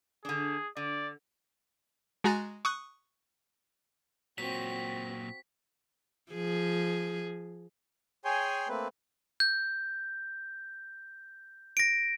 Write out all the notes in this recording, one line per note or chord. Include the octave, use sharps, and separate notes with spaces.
D3 D4 G#4
D3 D5
G#3 F#4 G#5 A#5 F#6 A6
C#6 D#6 F#6
A#2 F#3 C4 F#4 B6
F3 G#4
G#4 C#5 G5 G#5 C6
A3 A#3 C4 B4
G6
A#6 D7